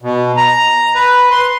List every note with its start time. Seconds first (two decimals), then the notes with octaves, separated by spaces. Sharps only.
0.02 B2
0.37 A#5
0.95 B4
1.31 C6